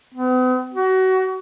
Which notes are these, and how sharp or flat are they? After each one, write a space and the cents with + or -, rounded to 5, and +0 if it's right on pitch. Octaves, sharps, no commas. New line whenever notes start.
B3 +45
F#4 +25